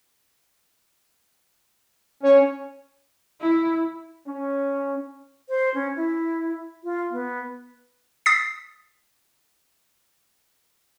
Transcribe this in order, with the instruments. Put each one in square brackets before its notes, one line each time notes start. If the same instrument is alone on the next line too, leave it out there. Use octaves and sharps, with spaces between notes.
[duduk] C#4 [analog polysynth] C#5
[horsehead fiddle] E4
[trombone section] C#4
[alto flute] C5
C#4
E4
F4
B3
[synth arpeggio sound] D#6 A6 B6 C7